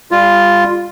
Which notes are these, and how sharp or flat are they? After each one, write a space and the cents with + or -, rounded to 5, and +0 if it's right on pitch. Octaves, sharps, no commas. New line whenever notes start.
G3 +30 F4 +0